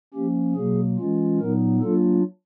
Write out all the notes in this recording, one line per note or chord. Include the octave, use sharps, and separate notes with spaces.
F3 A#3 C#4 G4
B2 F#3 A#3 G#4
E3 G#3 C#4 F4
A#2 F#3 B3 D#4 A#4
F#3 A#3 D4 F4 A4